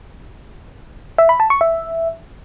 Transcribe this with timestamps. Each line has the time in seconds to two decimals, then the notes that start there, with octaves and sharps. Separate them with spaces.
1.18 E5
1.29 B5
1.40 A5
1.50 C#6
1.61 E5